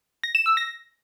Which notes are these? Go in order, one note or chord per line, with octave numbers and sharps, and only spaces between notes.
A#6
E7
E6
A#6